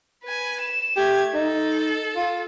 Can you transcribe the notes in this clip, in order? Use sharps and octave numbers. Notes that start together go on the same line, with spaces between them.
B4 G#5
E7
A3 G4 G#6
D#4 A4
F4